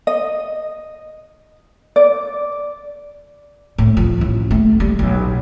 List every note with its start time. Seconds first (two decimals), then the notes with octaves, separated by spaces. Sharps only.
0.07 D#5
1.96 D5
3.78 A2
3.97 F3
4.21 A1
4.51 A3
4.80 G3
4.99 B1